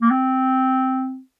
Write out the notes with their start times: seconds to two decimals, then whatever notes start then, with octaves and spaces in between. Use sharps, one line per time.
0.02 A#3
0.10 C4